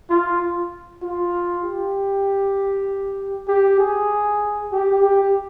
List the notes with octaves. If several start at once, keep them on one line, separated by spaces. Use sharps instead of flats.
F4
F4
G4
G4
G#4
G4
G4